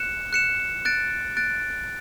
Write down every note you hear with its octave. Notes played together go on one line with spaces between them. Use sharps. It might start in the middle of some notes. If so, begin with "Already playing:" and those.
Already playing: F#6 C#7 E7
F#6 C#7 E7
F#6 A6 D7
F#6 A6 D7